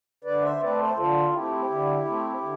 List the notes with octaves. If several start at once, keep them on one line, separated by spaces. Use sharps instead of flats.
D3 B4 D5
C5 E5
A3 C4 B4 D5
A4 C5
D3 F4 A4
A3 C4 E4 G4
D3
A3 C4
D3